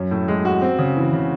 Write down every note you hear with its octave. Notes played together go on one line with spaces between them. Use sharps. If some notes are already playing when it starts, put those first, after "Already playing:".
Already playing: F#2 C#4
A2
G#3
F#4
C4
C#3
E3
C#3